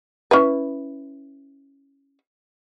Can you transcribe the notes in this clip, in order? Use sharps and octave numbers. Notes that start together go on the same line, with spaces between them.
C#4 E4 B4